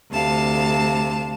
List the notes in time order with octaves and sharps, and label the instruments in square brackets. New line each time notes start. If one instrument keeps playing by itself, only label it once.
[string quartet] D2 C3 F5 A5